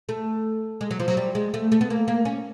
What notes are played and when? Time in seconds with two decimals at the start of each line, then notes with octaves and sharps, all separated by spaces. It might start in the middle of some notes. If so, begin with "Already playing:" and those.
0.09 A3
0.81 G#3
0.91 F#3
1.00 F3
1.08 F#3
1.17 G3
1.35 G#3
1.54 A3
1.72 A3
1.81 B3
1.90 A#3
2.08 A#3
2.25 C#4